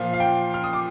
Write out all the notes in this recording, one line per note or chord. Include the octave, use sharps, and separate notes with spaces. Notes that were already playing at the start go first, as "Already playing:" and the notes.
Already playing: A#2 F3 F5
F5
G5
F6
D#6
D6